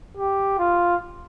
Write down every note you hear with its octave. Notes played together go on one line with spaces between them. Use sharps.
G4
F4